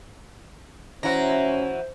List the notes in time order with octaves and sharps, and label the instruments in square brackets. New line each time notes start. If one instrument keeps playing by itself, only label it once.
[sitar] E3 E4 [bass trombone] C#4 [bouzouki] F#4 A#5 [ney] C5